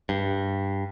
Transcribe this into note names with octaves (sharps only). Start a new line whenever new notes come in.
G2